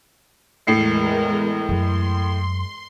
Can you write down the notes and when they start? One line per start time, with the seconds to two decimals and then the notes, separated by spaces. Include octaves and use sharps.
0.67 E2 A2 G#3 A#4 C7 C#7
1.69 F#2 C6